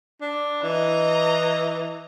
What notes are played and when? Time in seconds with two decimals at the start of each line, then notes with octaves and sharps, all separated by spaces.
0.21 D4
0.63 E3 D#5 A#5